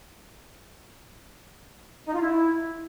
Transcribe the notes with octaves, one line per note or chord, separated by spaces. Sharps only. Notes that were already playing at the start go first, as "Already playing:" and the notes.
D#4
F4
E4